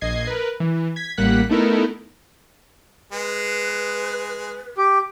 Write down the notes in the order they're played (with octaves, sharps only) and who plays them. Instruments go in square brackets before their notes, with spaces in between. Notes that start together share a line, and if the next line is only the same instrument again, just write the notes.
[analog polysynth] A#1 D#5 G#6 C7
A#4 B4
E3
G#6 B6
A1 G3 A#3 F#5 F#6 B6
A3 B3 D#4 E4 A4 A#4
[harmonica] G#3 [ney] B4
[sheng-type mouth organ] G4